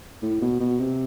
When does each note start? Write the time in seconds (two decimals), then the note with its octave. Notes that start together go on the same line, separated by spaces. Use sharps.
0.22 A2
0.41 B2
0.60 B2
0.79 C3